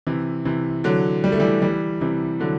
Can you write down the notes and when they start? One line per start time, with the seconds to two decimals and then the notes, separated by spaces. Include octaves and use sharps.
0.07 C3 E3
0.45 C3 E3
0.84 D3 F#3
1.24 G3
1.32 A3
1.40 E3 G3
1.62 E3 G3
2.01 C3 E3
2.40 D3 F#3